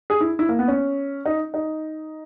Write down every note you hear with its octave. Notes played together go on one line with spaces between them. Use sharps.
G#4
E4
E4
A#3
B3
C#4
D#4
D#4